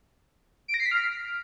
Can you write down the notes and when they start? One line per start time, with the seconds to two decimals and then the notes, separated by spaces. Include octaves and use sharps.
0.68 D7
0.74 A#6
0.80 C7
0.86 B6
0.91 F6